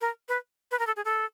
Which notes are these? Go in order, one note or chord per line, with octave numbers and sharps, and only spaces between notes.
A#4
B4
B4
A#4
A4
G#4
A4